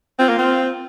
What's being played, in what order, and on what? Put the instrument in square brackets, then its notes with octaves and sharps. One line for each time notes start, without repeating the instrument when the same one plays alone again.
[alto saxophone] C4 [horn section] F4
[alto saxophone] A#3
C4